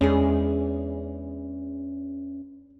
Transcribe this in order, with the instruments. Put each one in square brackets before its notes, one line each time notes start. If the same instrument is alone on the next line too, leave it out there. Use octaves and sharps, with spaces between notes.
[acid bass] E2 [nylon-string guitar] G#3 D4 G#4 [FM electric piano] C#4